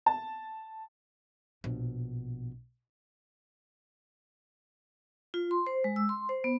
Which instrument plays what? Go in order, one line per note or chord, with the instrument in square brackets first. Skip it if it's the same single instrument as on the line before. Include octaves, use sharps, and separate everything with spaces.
[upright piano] A5
[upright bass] A#1 B2
[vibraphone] F4
C6
C5
G#3
E6
C6
C5
B3